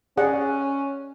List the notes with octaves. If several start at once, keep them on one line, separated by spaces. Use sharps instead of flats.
C#4 G#4 D5 F#5